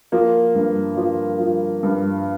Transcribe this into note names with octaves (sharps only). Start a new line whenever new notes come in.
F3 A#3
G2
F3
F3
G2